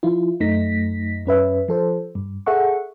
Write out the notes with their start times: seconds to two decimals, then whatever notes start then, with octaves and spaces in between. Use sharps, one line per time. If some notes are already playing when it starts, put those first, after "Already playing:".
0.03 F3 E4 F4
0.40 F#2 A3 D#4 A#6 B6
1.26 F#2 C#4 B4 E5
1.68 F3 A4 C5
2.15 G2
2.46 G#4 A4 E5 F#5 C#6